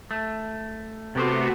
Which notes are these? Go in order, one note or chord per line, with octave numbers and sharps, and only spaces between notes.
A3
C3 A3 B3 F#4 G4 C5